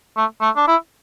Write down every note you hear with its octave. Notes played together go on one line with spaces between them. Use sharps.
A3
A3
D4
E4